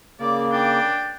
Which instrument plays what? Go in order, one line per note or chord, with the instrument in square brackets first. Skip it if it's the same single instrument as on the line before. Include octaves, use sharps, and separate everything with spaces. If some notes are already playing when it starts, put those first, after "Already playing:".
[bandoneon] C#3 A#3 [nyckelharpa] D5
[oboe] D4 [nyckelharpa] G5